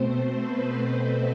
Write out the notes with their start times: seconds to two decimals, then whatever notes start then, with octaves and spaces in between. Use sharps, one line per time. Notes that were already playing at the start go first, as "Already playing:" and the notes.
Already playing: B2 A3 C4 C5
0.41 B4